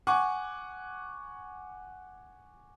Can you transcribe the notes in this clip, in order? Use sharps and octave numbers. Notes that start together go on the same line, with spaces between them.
F#5 G#5 C#6 D6